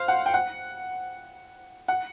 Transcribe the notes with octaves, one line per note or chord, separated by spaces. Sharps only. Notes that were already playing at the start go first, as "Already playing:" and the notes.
Already playing: C5 F5
F#5
G5
F#5
F#5